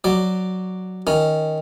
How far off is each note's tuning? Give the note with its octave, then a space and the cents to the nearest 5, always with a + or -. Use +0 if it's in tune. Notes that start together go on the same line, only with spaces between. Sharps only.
F#3 +0 D5 +0
D#3 +5 C#4 +0